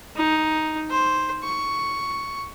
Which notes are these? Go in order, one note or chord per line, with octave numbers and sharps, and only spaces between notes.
D#4
C5
C#6